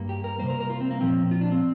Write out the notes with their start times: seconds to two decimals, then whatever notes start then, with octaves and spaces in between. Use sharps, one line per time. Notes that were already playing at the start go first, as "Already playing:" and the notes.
Already playing: G2 G3 A#3
0.09 G4
0.24 A#4
0.39 C3 G3 A#3 C5
0.50 A#4
0.60 A#4
0.70 F4
0.80 C4
0.91 A#3
1.01 A#2 F3 A#3 C4
1.31 F4
1.41 D4
1.52 C4